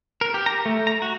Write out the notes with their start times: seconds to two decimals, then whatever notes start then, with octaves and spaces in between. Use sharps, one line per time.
0.21 A#4
0.34 G4
0.46 A#5
0.66 A3
0.87 A#5
1.02 F#4